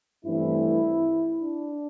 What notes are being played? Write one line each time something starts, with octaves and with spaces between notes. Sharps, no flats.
G2 E3 A3 C4 E4
D4